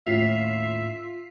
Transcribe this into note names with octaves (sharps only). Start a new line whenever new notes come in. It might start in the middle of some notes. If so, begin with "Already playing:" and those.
D#2 A2 C#4 F4 E5 B6 C7